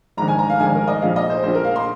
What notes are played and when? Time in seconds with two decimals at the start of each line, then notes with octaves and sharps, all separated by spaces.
0.17 A#1 G#2 D#3 A#5
0.28 G#5
0.39 A#5
0.50 F5
0.60 A#1 G#2 D#3 G#5
0.74 A#4
0.88 D#5
1.02 A#1 A#2 F3 F5
1.16 D#5
1.30 C5
1.43 A#1 A#2 F3 C5
1.54 A#4
1.64 F5
1.76 C6